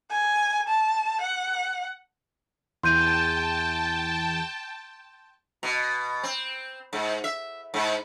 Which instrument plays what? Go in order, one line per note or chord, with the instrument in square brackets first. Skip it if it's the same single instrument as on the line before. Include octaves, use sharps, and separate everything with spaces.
[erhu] G#5
A5
F#5
[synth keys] E2 [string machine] G5 A5 [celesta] C6 G6 D#7
[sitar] B2
C4
G#2
E5
G#2